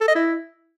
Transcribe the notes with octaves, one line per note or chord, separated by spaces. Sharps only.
A4
D#5
E4